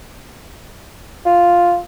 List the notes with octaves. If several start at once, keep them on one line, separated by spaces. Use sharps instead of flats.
F4